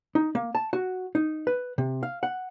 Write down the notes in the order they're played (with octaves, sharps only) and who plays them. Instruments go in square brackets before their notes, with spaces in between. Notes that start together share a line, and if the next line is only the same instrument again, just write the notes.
[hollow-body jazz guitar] D#4
A#3
A5
F#4
D#4
B4
C3
F5
F#5